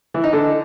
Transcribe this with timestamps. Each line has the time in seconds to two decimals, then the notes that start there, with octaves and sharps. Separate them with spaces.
0.14 E3
0.24 D#4
0.33 D3